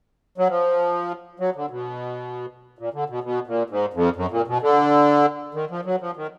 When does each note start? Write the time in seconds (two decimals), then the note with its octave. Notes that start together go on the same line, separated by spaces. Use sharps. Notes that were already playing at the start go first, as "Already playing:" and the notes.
0.38 F#3
0.48 F3
1.40 F#3
1.56 D3
1.71 B2
2.79 A#2
2.94 D3
3.09 B2
3.24 B2
3.47 A#2
3.70 G#2
3.93 F2
4.16 F#2
4.31 A#2
4.47 B2
4.62 D3
5.54 D#3
5.70 F3
5.85 F#3
6.01 F3
6.16 D#3